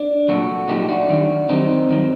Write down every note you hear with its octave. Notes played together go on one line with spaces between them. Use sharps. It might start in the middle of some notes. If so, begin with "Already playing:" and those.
Already playing: D4
C2 A#2 F#3 F#4 A4
C2 A#2 F#3 D#4 G4
D4 F#4
F#2 D#3 G3
F#2 D#3 G3 C4 D#4
G2 D#3 F#3